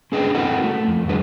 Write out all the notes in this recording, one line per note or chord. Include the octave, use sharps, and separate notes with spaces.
C#4 D4 G#4 B4 D#5 G5
C4 E4 F#4 A4 A#4 F#5
A3
F2
D#3 G3 D4 F#4 G#4 B4